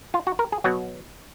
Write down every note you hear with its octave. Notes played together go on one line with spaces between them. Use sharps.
F4
F#4
A#4
G#4
B2 F#3 F#4